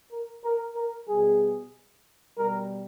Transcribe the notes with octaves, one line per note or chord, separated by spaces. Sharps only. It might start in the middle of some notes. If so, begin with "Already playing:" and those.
A#4
A#4
A#4
B2 G3 G#4
B2 G3 A#4